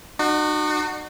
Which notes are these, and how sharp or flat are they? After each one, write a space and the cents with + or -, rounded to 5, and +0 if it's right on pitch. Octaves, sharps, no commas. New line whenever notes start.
D#4 -45 F#4 +0